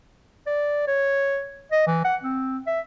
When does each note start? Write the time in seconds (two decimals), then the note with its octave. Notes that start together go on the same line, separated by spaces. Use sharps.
0.47 D5
0.88 C#5
1.72 D#5
1.87 E3
2.04 F#5
2.22 C4
2.67 E5